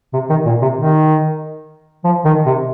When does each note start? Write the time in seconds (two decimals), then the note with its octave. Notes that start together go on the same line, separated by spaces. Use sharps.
0.13 C3
0.30 D#3
0.46 A#2
0.62 C3
0.77 D#3
2.04 F3
2.25 D#3
2.46 C3